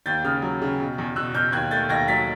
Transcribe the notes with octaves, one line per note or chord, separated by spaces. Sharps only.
D#2 G6 A6
C#3 D#6 F6
F#3
C#3
B2
E2
B2 E6 F#6
B2 F6 G6
D#2 F#6 G#6
A3 G6 A6
D#2 G#6 A#6
F#3 A6 B6